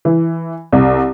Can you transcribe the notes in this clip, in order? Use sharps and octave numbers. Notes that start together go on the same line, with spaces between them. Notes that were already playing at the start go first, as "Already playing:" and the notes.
E3
C2